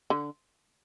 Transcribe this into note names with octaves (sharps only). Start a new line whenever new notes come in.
D3